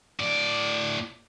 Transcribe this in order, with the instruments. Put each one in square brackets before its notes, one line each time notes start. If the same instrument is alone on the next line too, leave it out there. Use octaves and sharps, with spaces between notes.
[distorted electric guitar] A2 D5